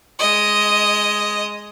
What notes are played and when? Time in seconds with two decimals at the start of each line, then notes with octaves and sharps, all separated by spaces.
0.19 G#3 D#5